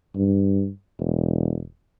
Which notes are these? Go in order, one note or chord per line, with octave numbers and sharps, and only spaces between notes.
G2
E1